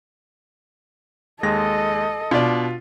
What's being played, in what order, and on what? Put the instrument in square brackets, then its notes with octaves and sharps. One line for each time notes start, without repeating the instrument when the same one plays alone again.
[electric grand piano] D#2 G#3 A#6 [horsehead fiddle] A4 D#5
[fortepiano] B2 D4 D5 [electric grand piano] F4